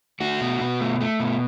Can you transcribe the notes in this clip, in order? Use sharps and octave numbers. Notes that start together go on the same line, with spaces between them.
A3 F#4
B2
B2
A3
A3
B2